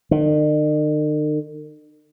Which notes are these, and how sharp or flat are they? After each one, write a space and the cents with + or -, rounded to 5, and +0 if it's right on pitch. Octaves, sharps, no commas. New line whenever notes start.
D#3 -45